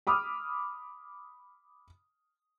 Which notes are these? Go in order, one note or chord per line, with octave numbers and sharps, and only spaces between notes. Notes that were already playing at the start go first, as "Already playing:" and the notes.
B5 D6 D#6 F6